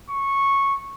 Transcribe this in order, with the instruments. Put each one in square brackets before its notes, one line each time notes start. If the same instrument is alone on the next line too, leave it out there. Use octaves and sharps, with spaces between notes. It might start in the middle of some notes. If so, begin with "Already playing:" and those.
[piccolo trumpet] C#6